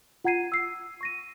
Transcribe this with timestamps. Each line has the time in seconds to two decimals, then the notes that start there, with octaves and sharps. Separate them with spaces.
0.24 F4 F#5 A#5 G#6 C7 D#7
0.52 E6 C7
1.01 C#6 A#6 D#7